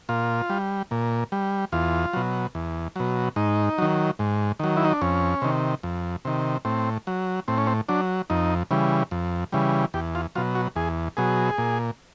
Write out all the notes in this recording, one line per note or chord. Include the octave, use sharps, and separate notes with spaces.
A#2 F4
G3
A#2
G3
E2 F4
B2 F#3
E2
B2 F#3
G#2 D#4
D#3 F#3
G#2
D#3 F#3
E4
D#4
D4
F2 C#4
C3 D#3
F2
C3 D#3
A2 C4
F#3
A2 C4
C#4
C4
F#3 D4
F2 D#4
C#3 E3 G3
F2
C#3 E3 G3
E2 G4
F4
B2 F#3 F4
F#4
E2 G#4
B2 F#3 G#4
A#2